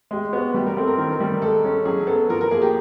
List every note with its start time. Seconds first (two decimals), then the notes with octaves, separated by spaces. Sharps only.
0.11 G#3 G4
0.32 B3 F#4
0.54 G3 G4
0.66 A#4
0.77 C4 A4
0.88 A#4
0.98 D#3 A#4
1.20 G3 A#4
1.42 G#3 A4
1.65 C#4
1.85 F#3 G#4
2.07 B3 A4
2.29 F3 A#4
2.41 A#4
2.51 A#3 G#4
2.62 G4